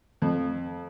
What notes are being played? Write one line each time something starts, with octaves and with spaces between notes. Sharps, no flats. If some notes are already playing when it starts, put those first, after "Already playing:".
F2